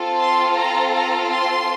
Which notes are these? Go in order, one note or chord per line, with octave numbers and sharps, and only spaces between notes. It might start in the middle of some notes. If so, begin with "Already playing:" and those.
Already playing: C4 F4 A4
C6
A#5
A#5
C6